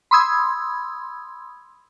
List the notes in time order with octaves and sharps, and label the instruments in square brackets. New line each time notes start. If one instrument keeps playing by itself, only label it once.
[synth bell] B5 C6 D#6 E6 G#6